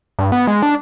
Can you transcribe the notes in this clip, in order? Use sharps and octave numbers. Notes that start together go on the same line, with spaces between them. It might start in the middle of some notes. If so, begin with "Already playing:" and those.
G2
B3
G#3
D4